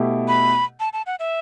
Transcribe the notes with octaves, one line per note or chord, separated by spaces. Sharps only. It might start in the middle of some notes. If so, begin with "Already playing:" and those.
Already playing: B2 A3 E4 G4
B5
A5
A5
F#5
E5